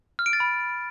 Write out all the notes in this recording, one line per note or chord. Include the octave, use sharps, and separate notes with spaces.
F6
D7
A6
B5